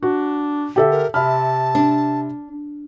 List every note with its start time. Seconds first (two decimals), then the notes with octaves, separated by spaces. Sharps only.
0.03 D4 F#4
0.76 D3 G4 A4 E5
0.91 A#4
1.14 C3 E5 A5 B5 F6
1.75 D4